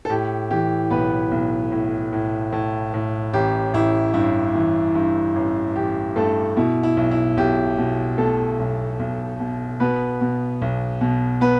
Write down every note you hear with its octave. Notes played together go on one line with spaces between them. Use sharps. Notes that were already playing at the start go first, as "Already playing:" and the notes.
A4
A2 G4
E3 G4
B1 B3 B4
B1
A2
A2
A2
A2
A1 G4
A1 E4
G2 E4
E3
G2
A1
A1 G4
G2 A3 A4
B2 E4
E4
B1
E4
B1 G4
B2
B2 A3 A4
B1
B1
B2
B2 B3 B4
B2
B1
B2
B3 B4